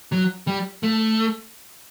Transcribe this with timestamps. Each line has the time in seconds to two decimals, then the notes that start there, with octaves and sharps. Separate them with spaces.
0.12 F#3
0.47 G3
0.83 A3